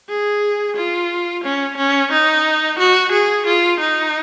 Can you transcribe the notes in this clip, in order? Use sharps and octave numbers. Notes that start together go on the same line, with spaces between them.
G#4
F4
C#4
C#4
D#4
F#4
G#4
F4
D#4